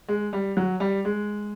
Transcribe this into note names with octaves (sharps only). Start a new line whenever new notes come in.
G#3
G3
F#3
G3
G#3